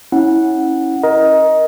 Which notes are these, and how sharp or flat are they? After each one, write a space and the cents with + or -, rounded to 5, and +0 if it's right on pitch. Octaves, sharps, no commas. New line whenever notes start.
C#4 -10 E4 -25 F#5 +0
A#4 +20 D#5 +10 A#5 +20